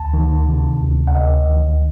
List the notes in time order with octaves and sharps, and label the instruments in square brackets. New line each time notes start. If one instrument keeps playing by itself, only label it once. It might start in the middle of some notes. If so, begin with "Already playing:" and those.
Already playing: [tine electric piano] D2 A5
D#3
C3
D2
F#5
D2 D#5
D#3